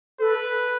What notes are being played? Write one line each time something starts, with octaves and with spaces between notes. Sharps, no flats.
A4 B4